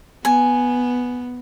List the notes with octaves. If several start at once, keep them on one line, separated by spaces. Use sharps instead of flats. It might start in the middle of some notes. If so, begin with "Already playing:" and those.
B3 G#5